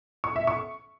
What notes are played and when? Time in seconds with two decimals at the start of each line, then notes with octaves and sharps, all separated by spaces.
0.24 C#6
0.36 E5
0.47 C#6